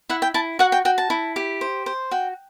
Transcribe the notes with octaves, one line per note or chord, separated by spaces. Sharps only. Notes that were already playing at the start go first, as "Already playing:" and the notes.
E4 F#5
G5
E4 A5
F#4 F#5
G5
F#4 G5
A5
E4
G4
C5
C5
F#4 G5